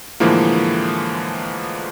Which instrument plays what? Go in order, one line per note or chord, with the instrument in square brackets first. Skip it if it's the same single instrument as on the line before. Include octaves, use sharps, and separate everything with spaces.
[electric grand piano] A2 D3 E3 F3 G#3 A#3